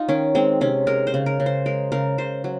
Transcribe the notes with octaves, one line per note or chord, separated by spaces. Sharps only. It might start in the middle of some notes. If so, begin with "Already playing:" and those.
Already playing: D#4 F4
D#3 C#4
G#3 C4
C3 C#4
G#3 A#4
C5
C#3
A#4
C#3
C5
G#3 A#4
C#3 A#4
C#3 C5
F#3